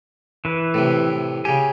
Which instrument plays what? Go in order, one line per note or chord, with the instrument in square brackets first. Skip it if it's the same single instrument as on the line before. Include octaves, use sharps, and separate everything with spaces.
[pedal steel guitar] E3 B4
[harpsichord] A2 C3
[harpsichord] C#3 G4 [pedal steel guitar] G#5